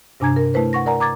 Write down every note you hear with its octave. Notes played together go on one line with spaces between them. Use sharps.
G2 C3 D4 G#5 A#5 G#6
A#4
A3 E4 B4 C5
F#5 C#6 A#6
A#4 D5 F#5 G#5 A#5
A#5 D6 G#6 A6